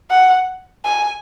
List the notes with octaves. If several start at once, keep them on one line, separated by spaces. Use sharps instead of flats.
F#5
G#5